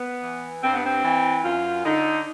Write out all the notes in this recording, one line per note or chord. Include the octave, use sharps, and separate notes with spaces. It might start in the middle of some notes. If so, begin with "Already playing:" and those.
Already playing: B3
E3
G2 C4
B3
C4
E3
F#2 F4
D3 D#4